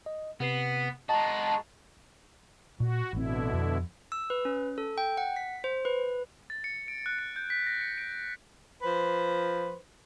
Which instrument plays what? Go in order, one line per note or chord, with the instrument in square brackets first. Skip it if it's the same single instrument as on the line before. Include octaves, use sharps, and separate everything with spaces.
[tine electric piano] D#5
[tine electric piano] C3 B4 C7 [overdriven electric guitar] B3
[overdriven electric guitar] G#3 F#4 [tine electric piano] D#5 A#5 [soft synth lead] A5
[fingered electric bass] A#2 [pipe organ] F#4
[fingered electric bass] A1 C4 [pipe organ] B2 D3 E4
[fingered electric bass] F2
[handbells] E6
B4
C#4
A4
G5
F#5
B6
C5
B4
[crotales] A6
C#7
D7
F#6
C#7
G6
B6
A#6
C#7
D7
[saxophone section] F3 B4 C5